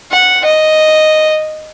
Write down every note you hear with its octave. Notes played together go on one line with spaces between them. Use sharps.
F#5
D#5